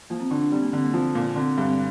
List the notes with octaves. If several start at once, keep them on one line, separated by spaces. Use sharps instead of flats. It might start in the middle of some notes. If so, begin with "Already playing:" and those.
F3 A#3
C4
D3 D4
D4
G3 C4
A#3
D3 C4
A#3
F3 C4
A#2 A#3
D3 C4
C4
G2
C4